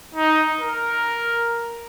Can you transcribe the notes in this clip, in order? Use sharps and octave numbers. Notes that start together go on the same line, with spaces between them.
D#4
A#4